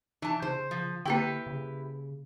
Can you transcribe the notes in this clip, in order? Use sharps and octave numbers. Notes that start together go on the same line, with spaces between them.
E3 D#4 A5
C#3 C5
F3
D3 A#3 E4 G4 B4 G5
C#3